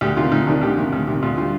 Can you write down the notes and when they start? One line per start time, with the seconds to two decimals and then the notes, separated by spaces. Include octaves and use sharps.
0.01 D2 G4
0.17 C3 D#3 F4
0.32 D2 D#4
0.47 C3 D#3 D4
0.61 D2 G4
0.77 C3 D#3
0.93 D2
1.07 C3 D#3
1.23 D2 F4
1.37 D3 G3 F4